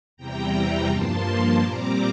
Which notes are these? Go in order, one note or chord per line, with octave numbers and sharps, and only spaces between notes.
E2 C3 E3 G3 G5 A#5
G2 F3 A#3 A5 C6
A#2 G3 C4 A#5 D6